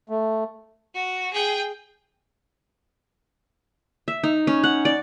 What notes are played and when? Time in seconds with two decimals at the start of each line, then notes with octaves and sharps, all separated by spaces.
0.09 A3
0.95 F#4
1.33 G#4 G5
4.08 E5
4.24 D#4
4.47 C#4
4.64 F#5
4.85 D5